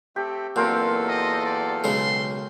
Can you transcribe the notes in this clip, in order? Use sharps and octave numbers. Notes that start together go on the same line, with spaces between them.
A3 C4 G4 A4
E2 A#2 F#3 C4 A4 A#4 F5
D#5
D5
B1 C#3 G#3 C6